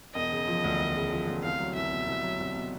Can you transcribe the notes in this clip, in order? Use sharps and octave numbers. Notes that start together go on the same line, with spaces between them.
E1 D#5
C#3
F3
D2
E1
C#3
F3
D2
C2 F5
F#3
C2 E5
B2
C2
F#3
C2
B2